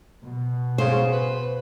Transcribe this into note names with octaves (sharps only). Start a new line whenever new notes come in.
B2
C#3 C5
B4